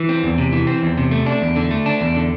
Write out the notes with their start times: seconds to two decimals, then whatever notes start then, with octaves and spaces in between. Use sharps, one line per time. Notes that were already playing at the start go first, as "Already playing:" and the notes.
Already playing: E3
0.09 C4
0.23 E2
0.38 C3
0.52 E3
0.67 C4
0.83 E2
0.97 C3
1.11 A3
1.26 D4
1.42 E2
1.56 D3
1.71 A3
1.86 D4
2.01 E2
2.16 D3